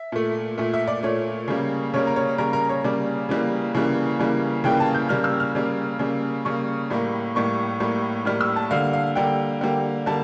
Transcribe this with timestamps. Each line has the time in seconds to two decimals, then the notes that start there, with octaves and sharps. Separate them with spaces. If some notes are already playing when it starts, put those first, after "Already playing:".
Already playing: E5
0.12 A#2 A3
0.58 A#2 A3 E5
0.74 E5
0.88 D5
1.03 A#2 A3 C#5
1.48 C#3 G3 A#3
1.94 C#3 G3 A#3 C#5
2.07 A#4
2.16 C#5
2.38 C#3 G3 A#3 A#4
2.53 A#4
2.69 C#5
2.84 C#3 G3 A#3 D5
3.29 C#3 E3 G3 A#3
3.75 C#3 E3 G3 A#3
4.19 C#3 E3 G3 A#3
4.64 C#3 E3 G3 A#3 G5
4.80 A5
4.95 G6
5.09 C#3 G3 A#3 F6
5.24 E6
5.40 F6
5.55 C#3 G3 A#3
5.99 C#3 G3 A#3
6.45 C#3 G3 A#3 C#6
6.90 A2 G3 A#3
7.35 A2 G3 A#3 C#6
7.80 A2 G3 A#3
8.25 A2 G3 A#3 F6
8.41 E6
8.56 A5
8.71 D3 G3 A#3 F5
8.93 F5
9.15 D3 G3 A#3 G5
9.61 D3 G3 A#3
10.06 D3 G3 A#3 A5